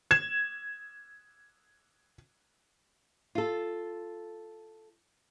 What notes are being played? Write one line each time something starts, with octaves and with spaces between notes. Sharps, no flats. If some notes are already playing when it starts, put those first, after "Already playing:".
G#6 E7
F4 A4